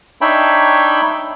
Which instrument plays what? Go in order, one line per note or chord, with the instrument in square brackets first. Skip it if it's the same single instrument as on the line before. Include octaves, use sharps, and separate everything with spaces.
[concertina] D4 D#4 C#5 E5 G5 B5